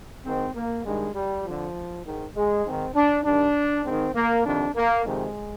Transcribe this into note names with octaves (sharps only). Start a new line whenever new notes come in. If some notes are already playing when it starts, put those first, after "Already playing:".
G#2 D#3 C4
A#3
G2 D#3 G#3
G3
F2 D3 F3
G#2 D#3
G#3
G#2 D#3 C4
D4
G2 D#3 D4
G#2 D#3 C4
A#3
F2 C3 D#3 D4
A#3
F2 C3 D#3 G#3